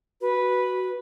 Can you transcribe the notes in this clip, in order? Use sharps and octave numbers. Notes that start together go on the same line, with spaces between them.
F#4 B4